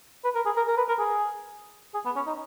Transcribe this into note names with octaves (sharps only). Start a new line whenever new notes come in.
B4
A#4
G#4
A#4
A#4
B4
A#4
G#4
G#4
B3
C#4
D#4